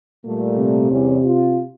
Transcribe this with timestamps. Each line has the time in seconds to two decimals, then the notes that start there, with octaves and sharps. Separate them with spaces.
0.25 A#2 G3 A3
0.57 C3
0.90 E2 G3 C#4
1.25 F4